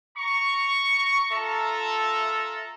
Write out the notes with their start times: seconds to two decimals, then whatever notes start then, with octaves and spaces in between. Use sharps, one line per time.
0.18 A#5 C#6
1.32 F4 A4 E5 A5 A#5